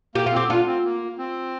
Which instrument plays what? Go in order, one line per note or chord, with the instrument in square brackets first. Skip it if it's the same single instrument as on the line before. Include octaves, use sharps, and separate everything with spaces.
[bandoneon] A#3 [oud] G4
[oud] F4
[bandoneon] C4 [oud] G4
[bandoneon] D4 [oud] F4
[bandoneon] C4
A#3
C4